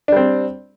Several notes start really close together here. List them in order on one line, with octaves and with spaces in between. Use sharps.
D4 G3 C4